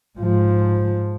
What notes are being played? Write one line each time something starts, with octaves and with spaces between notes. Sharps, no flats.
G#2 F3